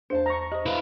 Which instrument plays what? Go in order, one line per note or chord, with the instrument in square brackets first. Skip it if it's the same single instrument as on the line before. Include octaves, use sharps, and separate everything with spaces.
[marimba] E2 D4 [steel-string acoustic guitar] C5 A5
[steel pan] A#5 C#6
[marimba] G4 C5 [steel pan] D#5
[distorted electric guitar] E4 F5 [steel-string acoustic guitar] B4